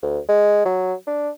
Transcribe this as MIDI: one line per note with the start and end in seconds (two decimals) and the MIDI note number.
0.02 0.18 38
0.29 0.64 56
0.65 0.94 54
1.07 1.30 62